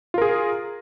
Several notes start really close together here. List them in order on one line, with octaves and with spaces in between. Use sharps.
F4 A#4 G#4